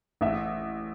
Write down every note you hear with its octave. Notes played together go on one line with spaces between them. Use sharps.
A1 E5